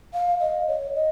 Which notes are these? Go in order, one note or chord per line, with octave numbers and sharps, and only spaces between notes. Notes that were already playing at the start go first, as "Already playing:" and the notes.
F5
D#5
C#5
D#5